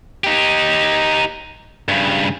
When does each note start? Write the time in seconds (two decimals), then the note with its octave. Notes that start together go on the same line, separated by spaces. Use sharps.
0.24 D#4 G4
1.88 G2 C#3